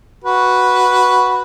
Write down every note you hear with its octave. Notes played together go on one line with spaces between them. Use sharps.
F#4 B4